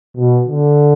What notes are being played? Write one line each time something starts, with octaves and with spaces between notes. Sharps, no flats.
B2
D3